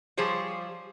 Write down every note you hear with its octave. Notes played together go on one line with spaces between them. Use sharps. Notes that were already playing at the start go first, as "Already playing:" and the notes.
F3 G3 G#4 C5 C#5